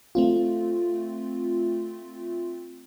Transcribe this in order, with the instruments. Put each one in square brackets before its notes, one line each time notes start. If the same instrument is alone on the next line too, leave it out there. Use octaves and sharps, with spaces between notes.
[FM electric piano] A3 C4 F4